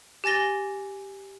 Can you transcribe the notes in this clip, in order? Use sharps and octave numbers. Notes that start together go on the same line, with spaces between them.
G4 G#5 A6 A#6 G7